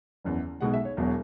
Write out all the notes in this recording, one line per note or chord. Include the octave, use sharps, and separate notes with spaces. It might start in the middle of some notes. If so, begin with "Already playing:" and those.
F#1 E2 C#3
B1 B2 G#3 F#5
E5
C#5
E1 E2 B2 F#3